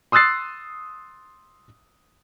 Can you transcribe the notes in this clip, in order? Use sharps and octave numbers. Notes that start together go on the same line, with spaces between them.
C6 D#6 E6 F#6 A6 C7